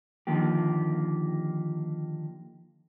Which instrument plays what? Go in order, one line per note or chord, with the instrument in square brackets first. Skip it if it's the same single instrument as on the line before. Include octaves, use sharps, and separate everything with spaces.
[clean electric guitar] D3 D#3 F3 A#3 G4